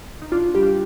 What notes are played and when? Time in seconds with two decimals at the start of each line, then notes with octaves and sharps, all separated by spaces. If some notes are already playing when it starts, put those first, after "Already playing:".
0.22 D#4
0.32 A#1 D4 F4
0.55 G3 G4
0.63 D4 F4